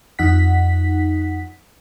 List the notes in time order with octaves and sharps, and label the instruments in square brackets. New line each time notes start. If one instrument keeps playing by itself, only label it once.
[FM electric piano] F2 D#4 F#5 B6